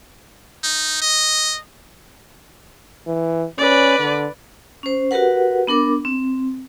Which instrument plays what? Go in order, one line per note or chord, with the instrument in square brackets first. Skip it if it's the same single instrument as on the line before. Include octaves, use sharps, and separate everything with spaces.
[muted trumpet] D#4
D#5
[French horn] E3
[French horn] C#4 [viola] B4 D5
[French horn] D3
[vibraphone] C#4 C5
F#4 G4 A#4 B4 F#5
B3 D4 A#4 D6
C4